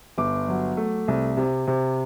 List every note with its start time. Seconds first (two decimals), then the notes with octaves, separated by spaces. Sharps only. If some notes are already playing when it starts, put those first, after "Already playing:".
0.18 G1 D6
0.48 F#3
0.77 A3
1.08 C2
1.37 C3
1.67 C3